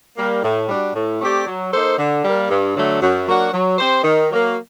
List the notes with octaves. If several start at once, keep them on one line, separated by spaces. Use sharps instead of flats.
G3 A#3
A2
G3 D4 F#4
A2
A3 C4 G4 D5
F#3
A#3 D#4 A4 C5
D3
G3 A#3
G2
D3 F#3 A3
F#2
F#3 A#3 D4 F#4
F#3
C4 G4 C5
D#3
F#3 A#3